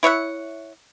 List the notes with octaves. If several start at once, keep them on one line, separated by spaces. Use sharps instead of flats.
E4 C#5 E5 F#5